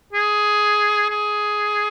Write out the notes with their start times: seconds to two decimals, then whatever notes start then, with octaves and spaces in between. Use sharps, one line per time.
0.13 G#4
1.10 G#4